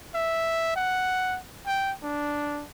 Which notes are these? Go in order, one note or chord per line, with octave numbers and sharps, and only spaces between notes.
E5
F#5
G5
D4